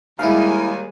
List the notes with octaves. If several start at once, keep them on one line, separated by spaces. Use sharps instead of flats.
D#2 G3 G#3 E4 F5 G#5